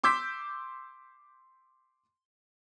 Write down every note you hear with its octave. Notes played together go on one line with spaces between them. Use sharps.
C6 D6 E6 G6 B6